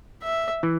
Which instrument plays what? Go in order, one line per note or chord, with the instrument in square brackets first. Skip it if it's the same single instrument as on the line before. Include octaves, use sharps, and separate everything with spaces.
[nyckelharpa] E5
[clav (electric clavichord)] E3